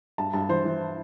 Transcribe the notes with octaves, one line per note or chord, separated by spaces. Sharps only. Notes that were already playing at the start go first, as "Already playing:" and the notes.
G2 A5
G2 A5
E3 C5
E3